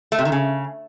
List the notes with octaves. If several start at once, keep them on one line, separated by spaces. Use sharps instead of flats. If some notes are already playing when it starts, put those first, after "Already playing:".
A3
C3
D#3
C#3